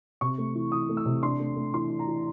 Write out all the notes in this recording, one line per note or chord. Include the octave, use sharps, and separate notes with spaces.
C3 C#6
A3
E3
E3 D#6
A3
E6
C3
D4 C6
A3
A3
E3 C6
E3
A#5
E3